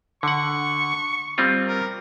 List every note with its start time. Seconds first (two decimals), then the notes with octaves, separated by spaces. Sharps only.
0.23 D3 F#5 C#6
1.38 G3 C4 F4
1.68 A#4